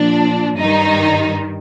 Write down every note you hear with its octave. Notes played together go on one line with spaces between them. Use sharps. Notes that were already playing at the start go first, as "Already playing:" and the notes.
Already playing: A#2 F3 D4
G2 D#3 G3 D#4